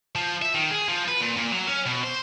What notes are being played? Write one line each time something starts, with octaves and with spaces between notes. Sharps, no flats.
F3
E5
D#3
G#4
F3
B4
A#2
A#2
F#3
C#4
B2
C5